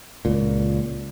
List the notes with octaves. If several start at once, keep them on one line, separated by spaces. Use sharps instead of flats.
C#2 A#2